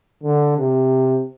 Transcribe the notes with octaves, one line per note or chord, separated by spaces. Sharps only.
D3
C3